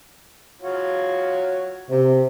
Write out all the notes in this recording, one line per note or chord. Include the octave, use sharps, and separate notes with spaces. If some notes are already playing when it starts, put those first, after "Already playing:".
F4 F#4 C#5
C3